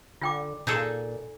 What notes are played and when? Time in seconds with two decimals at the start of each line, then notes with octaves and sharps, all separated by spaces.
0.21 D3 F4 G5 D6
0.67 A#2 D#4 G#4 A4